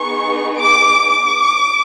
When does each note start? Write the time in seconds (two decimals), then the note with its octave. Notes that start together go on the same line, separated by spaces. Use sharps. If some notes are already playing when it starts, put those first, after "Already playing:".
Already playing: B3 D#4 G#4 C#6
0.58 D6
1.09 D6